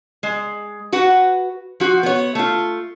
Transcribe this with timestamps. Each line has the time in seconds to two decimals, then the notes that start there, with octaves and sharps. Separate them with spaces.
0.23 G#3
0.93 F#4 B4 F#5
1.80 F3 F#4
2.03 B3 C#5
2.35 A3 F4